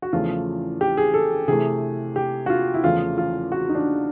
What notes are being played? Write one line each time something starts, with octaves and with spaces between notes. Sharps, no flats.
F#4
E2 C#3 F3 A3 F4
G4
G#4
A4
C3 E3 A3 G#4
G4
F#4
F4
E4
E2 C#3 F3 A3 F4
F4
F#4
D#4
D4